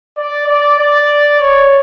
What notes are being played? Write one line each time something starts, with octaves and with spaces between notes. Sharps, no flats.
D5
D5
D5
C#5